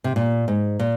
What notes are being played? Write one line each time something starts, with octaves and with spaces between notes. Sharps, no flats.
C3
A#2
G#2
A#2